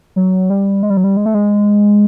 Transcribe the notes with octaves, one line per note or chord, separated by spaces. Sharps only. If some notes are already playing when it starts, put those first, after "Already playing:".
F#3
G3
G#3
G3
F#3
G3
G#3
A3
G#3